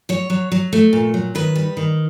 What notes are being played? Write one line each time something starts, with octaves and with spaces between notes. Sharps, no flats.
F#3 C#5
F#3
F#3
A3
A#2
F#3
D#3 B4
G3
D#3